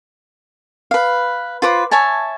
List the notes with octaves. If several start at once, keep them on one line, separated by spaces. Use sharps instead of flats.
B4 F5
F4 B4 C5 D6
C#5 E5 G#5 A5